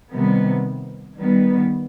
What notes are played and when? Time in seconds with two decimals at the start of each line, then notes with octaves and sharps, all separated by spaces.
0.12 C3 D#3 G3 B3
1.19 D#3 G3 B3